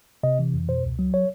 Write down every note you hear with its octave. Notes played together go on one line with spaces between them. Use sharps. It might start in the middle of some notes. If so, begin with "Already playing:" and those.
C3 D#5
E3
F2
B2 C5
C#2
F#3
C#5